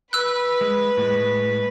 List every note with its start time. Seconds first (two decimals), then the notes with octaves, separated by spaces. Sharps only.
0.13 B4 B5 E6 F#6
0.61 G#3
0.97 A2 G#3